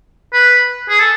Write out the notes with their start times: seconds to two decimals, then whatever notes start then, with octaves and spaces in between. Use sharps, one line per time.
0.33 B4
0.89 G#4
0.99 A4